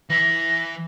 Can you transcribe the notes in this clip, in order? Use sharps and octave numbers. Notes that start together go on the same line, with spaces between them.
E3 E5 A#6